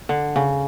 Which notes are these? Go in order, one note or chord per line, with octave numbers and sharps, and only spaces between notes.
D3
C#3